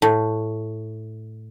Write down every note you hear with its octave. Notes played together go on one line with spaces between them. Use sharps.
A2